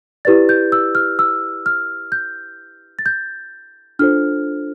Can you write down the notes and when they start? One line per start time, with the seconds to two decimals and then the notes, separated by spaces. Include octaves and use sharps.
0.25 E4 G4 B4 D5 A6
0.49 G6
0.72 E6
0.95 F6
1.19 E6
1.66 F6
2.12 G6
2.99 A6
3.06 G6
3.99 D4 F4 A4 C5 F6